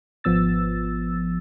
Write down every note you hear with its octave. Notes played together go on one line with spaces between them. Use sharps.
G#1 F3 B3 E6 A6